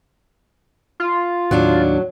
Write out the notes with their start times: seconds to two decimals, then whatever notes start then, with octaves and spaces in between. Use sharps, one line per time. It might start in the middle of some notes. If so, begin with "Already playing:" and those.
1.00 F4
1.51 D#2 A2 F#3 D4